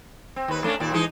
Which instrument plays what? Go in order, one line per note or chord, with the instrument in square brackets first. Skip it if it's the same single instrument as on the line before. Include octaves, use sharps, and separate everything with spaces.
[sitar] C4
D#2 B4
A3 C#4 D4
D#2 A#2 D5
E3 G#3 D#4